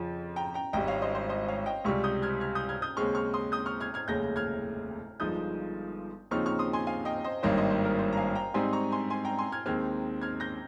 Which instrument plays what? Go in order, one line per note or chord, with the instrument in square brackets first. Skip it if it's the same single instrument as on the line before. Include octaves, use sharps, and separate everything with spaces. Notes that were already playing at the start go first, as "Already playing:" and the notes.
Already playing: [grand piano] F2 C#3 F3
[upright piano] G5 A#5
G5 A#5
[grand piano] G#1 G#2 G3 [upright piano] D#5 G5
[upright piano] C#5 F5
C5 D#5
C5
C5 D#5
C#5 F5
D#5 G5
[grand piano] C#2 C3 G3 [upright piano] C#6 F6
[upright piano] D#6 G6
F6 G#6
F6 G#6
D#6 G6
F6 G#6
D#6 G6
[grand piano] D#2 C#3 G#3 C4 [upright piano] C#6 F6
[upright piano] C#6 F6
C6 D#6
D#6 G6
C#6 F6
F6 G#6
F6 G#6
[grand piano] F1 D#2 C#3 G#3 [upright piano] G6 A#6
[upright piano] F6 G#6
[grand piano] G1 G2 F3 G#3 D#4 [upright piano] D#6 G6
[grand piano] D#2 C#3 F3 C4 D#4 [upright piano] C#6 F6
[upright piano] C#6 F6
C6 D#6
G#5 C6
F5 G#5
D#5 G5
C5 D#5
[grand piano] G#1 G2 D#3 A#3 C#4 [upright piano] C5 D#5
[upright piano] C5 D#5
C5
A#4
C5
A#5
F5 G#5
G5 A#5
[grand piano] G#2 G3 C4 D#4 [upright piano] G#5 C6
[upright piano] A#5 C#6
G#5 C6
G#5 C6
G5 A#5
G#5 C6
F6 G#6
[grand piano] D#2 D#3 G#3 C4 [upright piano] F6 G#6
[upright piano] F6 G#6
G6 A#6